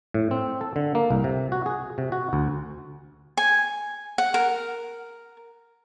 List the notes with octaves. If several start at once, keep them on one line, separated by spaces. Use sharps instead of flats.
A2
C4
A4
D3
A#3
C2
C3
F#4
G#4
C3
F#4
D2
G#5
F#5
A#4